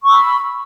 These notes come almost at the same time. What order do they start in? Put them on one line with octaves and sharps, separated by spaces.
C#6 E6 B5